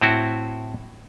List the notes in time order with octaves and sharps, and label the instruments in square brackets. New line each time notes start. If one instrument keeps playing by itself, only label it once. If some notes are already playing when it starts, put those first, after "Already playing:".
[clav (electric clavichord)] A2 C4 E4 F#4